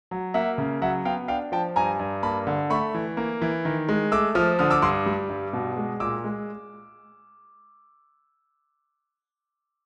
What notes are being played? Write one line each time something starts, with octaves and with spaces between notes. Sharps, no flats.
F#3
A#3 E5 F#5
C#3
F#3 E5 F#5
B3 F5 G5
D4 F5 G5
F3 G5 A5
G2 G#5 A#5
G2
A#3 A5 B5
D3
A3 B5 C#6
E3
A#3
E3
D#3
G#3
A3 D6 E6
F3 D#6 F6
D3 D#6 F6
D6 E6
G2 C6 D6
G3
G2
B2
G#3
A#2 D6 E6
G#3